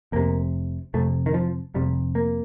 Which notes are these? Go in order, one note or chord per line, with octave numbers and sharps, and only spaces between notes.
F1 F2 C3 A#3
F1 F2 C3 A3
D#3
F3
F1 F2 C3 G3
A#3